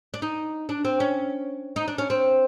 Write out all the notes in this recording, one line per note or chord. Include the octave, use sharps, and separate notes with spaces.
D4
D#4
D4
C4
C#4
D#4
D4
C#4
C4